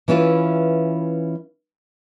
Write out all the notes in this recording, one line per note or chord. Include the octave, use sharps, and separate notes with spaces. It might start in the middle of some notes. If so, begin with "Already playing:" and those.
E3 C#4 E4 F4 B4